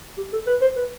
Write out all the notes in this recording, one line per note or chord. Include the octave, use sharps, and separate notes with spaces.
G4
A4
B4
C5
B4